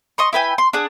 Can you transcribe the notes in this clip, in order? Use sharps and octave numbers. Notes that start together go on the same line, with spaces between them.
D#5 C6 C#6
E4 B4 G5 G#5
C6
D4 G#4 F#5